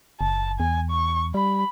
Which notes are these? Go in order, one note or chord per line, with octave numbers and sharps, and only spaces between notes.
F#1 A5
E2 G#5
C#6
G3 B5